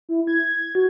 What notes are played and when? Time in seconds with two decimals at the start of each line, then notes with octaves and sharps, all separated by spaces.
0.09 E4
0.27 G#6
0.75 F#4